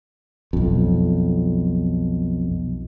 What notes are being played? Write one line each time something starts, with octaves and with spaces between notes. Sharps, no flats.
B1 F2